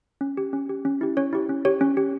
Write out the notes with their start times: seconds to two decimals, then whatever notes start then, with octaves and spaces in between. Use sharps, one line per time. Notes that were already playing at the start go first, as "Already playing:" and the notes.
0.21 C#4
0.37 G4
0.53 C#4
0.70 G4
0.85 C#4
1.01 E4 G4
1.17 C#4 C#5
1.33 E4 G4
1.49 C#4
1.65 G4 C#5
1.81 C#4
1.97 G4